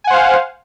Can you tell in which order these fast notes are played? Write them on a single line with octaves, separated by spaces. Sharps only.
G#5 F#5 C5 F5